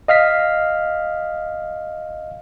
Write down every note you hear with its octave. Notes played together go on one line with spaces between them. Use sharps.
D#5 F5 F6 B6